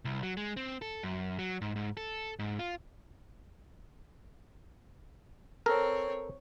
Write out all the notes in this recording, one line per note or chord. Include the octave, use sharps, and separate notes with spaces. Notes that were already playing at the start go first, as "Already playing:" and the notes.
C2
F#3
G#3
C4
A4
F#2
F#3
G#2
G#2
A4
G#2
F4
C4 A4 A#4 C#5